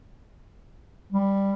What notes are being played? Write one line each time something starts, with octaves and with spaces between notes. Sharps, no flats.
G3